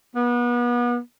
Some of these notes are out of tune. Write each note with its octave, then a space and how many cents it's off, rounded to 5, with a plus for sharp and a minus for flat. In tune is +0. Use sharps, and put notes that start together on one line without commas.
B3 -35